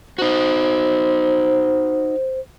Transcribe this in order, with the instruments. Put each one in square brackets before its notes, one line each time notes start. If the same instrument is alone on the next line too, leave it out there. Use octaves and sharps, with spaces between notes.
[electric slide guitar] D#4 F#4 [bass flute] C5